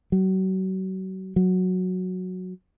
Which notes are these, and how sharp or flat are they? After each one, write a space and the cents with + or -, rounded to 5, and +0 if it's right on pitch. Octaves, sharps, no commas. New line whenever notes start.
F#3 +35
F#3 -10